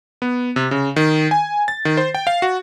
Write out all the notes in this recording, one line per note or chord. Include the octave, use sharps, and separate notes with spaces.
B3
C3
C#3
D#3
G#5
A6
D#3
C5
G5
F5
F#4